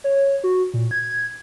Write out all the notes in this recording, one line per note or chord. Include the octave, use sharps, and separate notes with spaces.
C#5
F#4
A#2
G#6